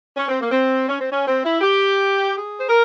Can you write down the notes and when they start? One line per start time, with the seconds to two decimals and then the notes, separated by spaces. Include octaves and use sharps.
0.16 C#4
0.28 C4
0.38 A#3
0.50 C4
0.88 C#4
1.00 C4
1.10 C#4
1.26 C4
1.43 E4
1.61 G4
2.34 G#4
2.58 C5
2.69 A#4